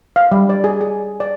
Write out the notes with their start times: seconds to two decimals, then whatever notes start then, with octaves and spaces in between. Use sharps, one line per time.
0.16 F5
0.32 G3
0.49 D5
0.64 G#4
0.81 G#4
1.20 D5